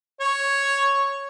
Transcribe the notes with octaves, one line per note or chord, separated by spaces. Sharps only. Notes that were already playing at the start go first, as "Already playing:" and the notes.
C#5